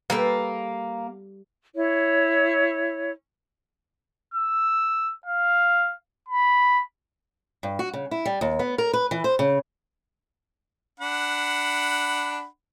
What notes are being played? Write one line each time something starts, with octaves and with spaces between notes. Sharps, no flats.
G3 A#3 A4 B4
E4 C#5
E6
F5
B5
G2
F#4
C#3
E4
G3
D#2
B3
A#4
B4
E3
C5
C#3
D4 F#5 B5